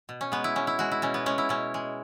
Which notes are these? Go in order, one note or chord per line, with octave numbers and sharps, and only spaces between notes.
B2
C#4
G#3 B3
E4
B2 C#4
E4
G#3 F#4
E4
B2 C#4
B3
G#3 C#4
E4
B2 C#4
G#3